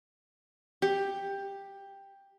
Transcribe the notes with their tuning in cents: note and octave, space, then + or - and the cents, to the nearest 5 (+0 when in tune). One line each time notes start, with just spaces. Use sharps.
G4 +10